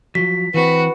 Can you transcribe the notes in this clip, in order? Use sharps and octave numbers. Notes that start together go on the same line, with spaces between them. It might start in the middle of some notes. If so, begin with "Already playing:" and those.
F3 F#3 B6
E3 C4 F#4 B4